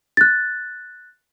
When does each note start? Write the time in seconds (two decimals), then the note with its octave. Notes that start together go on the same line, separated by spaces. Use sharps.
0.17 F#6 A6